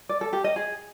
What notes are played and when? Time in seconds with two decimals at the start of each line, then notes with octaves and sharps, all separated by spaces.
0.09 D5
0.21 A4
0.33 G4
0.44 D#5
0.56 G#4